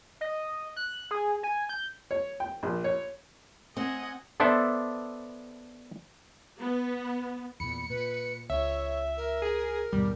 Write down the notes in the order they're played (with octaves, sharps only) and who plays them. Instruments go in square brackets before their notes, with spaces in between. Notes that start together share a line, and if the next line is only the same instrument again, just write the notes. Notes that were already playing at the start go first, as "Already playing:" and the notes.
[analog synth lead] D#5
F#6
G#4
G#5
G6
[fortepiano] C#5
G5
A#1
C#5
[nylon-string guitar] C4 [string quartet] D#5 F#5 G#5
[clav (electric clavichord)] B3 D4 A4 C5 D5 E5
[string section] B3
[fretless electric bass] E2 A#2 [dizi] B5 [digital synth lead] C#7
[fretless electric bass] A#2 [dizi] B4
[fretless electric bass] C#2 [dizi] C#5 [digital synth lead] E5
[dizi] A#4
[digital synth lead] G#4
[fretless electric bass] D#2 G#2 B2 [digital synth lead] G3